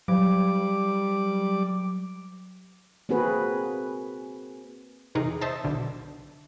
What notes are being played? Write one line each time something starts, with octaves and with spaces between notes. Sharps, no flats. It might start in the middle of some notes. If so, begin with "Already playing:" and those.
F#3 G3 D6
A#3 C4 F#4 G#4 B4
E2 C3 D#4 G#4 A#4
C5 D#5 E5 A5
B1 D3